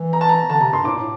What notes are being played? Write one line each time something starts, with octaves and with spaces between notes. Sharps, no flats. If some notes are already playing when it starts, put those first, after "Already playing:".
Already playing: E3
A#5
A5
A#5
D3 A5
C3 A#5
G2 C6
A2 D6
A#2
A2